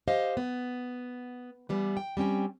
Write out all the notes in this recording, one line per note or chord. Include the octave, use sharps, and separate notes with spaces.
G4 C5 D#5 F5
B3
E3 G3 B3
G5
G3 C4 C#4 G5